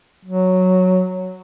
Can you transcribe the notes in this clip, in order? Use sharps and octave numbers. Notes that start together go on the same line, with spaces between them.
F#3